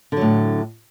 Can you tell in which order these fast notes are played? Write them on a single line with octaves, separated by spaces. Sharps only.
D3 F#3 A2